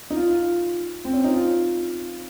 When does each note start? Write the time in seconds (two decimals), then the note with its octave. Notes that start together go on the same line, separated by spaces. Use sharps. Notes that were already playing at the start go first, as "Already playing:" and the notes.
0.10 D#4
0.17 F4
0.31 F4
1.05 C4
1.13 C#4
1.24 D#4
1.34 F4